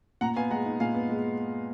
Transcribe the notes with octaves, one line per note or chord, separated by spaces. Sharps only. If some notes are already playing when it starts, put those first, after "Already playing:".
A#2 F#5 A#5
B3 F5 G#5
G#3 F#5 A#5
D#4
A#2 F5 G#5
B3
G#3